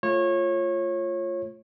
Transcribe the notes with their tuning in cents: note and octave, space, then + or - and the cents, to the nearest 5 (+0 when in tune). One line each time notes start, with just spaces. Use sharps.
A3 +5 F4 +0 C#5 -25